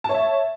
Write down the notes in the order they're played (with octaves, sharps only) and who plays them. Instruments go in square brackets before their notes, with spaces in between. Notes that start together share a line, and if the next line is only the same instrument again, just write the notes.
[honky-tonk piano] A5
C#5
E5